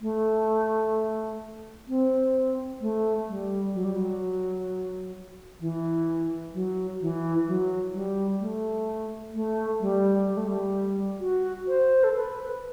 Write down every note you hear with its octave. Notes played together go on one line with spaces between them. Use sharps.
A3
C4
A3
G3
F#3
G3
F#3
E3
F#3
E3
F#3
G3
A3
A3
G3
G3
A3
G3
F#4
C5
A4
B4